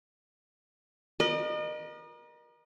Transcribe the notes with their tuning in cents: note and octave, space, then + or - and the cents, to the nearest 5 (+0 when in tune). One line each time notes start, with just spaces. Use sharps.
A#4 +35 D#5 -35